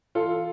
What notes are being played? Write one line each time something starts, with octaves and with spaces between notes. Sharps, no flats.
E3 F4 A4